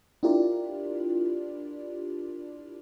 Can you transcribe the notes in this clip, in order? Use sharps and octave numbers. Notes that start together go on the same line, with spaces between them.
D4 E4 F4 G4 A#4 D5